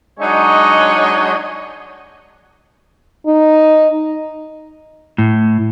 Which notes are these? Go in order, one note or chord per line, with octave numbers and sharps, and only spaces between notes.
F#3 G#3 D4 D#4 C#5 D#5
D#4
A2